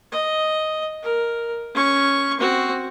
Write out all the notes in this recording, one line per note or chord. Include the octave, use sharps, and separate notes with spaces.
D#5
A#4
C#4 C#6
C4 F#4